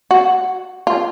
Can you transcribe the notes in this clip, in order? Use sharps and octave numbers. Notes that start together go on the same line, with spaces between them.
F#4
F4